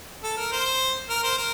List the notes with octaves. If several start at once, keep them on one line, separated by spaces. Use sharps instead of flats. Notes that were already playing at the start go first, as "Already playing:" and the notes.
A4
A#4
C5
A#4
C5
A#4